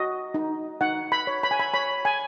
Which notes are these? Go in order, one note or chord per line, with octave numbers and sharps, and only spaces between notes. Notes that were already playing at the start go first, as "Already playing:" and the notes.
Already playing: F#4 D#5
D#4
D#4 F#5
B5
C#5
B5
G#5
B5
C#5 B5
G#5